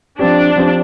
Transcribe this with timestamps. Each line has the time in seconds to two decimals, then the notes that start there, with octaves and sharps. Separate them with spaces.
0.19 F3 C4 D4 G4
0.56 F3 C4 G4